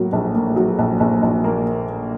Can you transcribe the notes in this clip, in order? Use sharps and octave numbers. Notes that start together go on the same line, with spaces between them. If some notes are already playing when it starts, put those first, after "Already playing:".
Already playing: A2 F#3 A#3
A#1
A#3
F#3
A#1
A#1
A#1
A#3